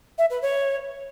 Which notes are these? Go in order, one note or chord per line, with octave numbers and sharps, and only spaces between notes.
E5
B4
C#5